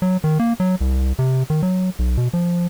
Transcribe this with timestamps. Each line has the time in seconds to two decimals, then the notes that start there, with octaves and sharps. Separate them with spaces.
0.02 F#3
0.24 D#3
0.39 A#3
0.60 F#3
0.81 C2
1.19 C3
1.50 D#3
1.63 F#3
1.99 B1
2.17 B2
2.34 F3